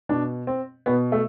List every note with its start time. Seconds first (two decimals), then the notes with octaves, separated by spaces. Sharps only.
0.09 B2 D4
0.47 C4
0.86 B2 B3
1.12 A3